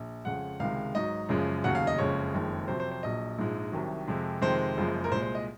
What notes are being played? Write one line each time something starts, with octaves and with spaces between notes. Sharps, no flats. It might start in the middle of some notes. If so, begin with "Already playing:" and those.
Already playing: A#1
F2 C#3 G#3 F#5
C#2 C3 D#3 G#3 F5
G#1 G#2 F#3 D#5
F#1 F#2 C#3 F3 G#3
F1 D#2 C#3 F#3 F#5
F5
D#5
F#1 F2 C#3 G#3 C#5
F#1 F2 D#3 G#3
F2 C3 F#3 C5
C5
C5
A#1 A#2 F#3 D#5
A#1 G#2 F3 G#3
C2 C3 D#3 F#3
F2 C3 F3 G#3
F2 C3 D#3 G#3 C5
F#1 F#2 F3 G#3
A#4
C2 A#2 G#3 C5
C5
D#5